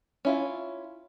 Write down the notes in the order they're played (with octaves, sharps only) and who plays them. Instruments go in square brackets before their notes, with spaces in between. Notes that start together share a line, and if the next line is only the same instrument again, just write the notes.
[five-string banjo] C#4 E4 F4